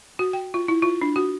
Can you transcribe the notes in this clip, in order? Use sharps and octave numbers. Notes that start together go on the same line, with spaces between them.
F#4
G5
F4
E4
F4
D4
F#4